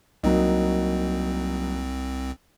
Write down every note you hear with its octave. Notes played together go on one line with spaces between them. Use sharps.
C2 F#3 A#3 C4 D#4